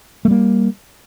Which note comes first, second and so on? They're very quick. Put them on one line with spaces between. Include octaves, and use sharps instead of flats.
A3 G3 A#3